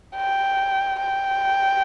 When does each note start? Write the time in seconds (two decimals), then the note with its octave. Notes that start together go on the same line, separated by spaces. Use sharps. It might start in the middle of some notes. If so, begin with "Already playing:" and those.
0.16 G5
1.00 G5